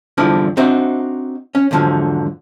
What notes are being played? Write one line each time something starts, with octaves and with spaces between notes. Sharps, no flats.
E2 G2 D3 F3 D4 E4
C4 D4 D#4 F#4 C5 E5
C#4
E2 G#2 D3 F3 F#3